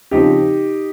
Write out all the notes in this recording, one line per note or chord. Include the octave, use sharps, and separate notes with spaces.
C#3 F3 C4 D#4 G4